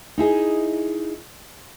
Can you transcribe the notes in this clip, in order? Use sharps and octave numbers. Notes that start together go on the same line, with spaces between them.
D#4 E4 G#4 D#5